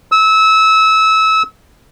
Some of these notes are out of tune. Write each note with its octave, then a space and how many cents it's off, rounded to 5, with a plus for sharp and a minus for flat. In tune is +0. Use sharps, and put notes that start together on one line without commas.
E6 -25